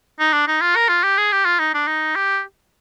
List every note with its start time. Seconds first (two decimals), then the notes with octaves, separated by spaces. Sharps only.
0.19 D#4
0.33 D4
0.48 D#4
0.61 F4
0.76 A#4
0.89 F4
1.03 G4
1.18 G#4
1.32 G4
1.45 F4
1.59 D#4
1.74 D4
1.87 D#4
2.16 G4